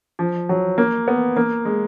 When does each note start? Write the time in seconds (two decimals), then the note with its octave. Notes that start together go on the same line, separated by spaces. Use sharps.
0.19 F3
0.49 F#3
0.78 A#3
1.08 B3
1.37 A#3
1.65 G#3